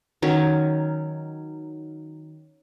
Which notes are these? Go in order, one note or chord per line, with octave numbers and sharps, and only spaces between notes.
D#3 F#3 C#4